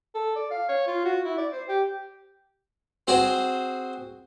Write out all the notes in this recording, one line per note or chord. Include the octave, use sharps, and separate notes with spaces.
A4
D5
F5
C#5
F4
F#4
E4
D5
C5
G4
C4 F#4 G#4 C5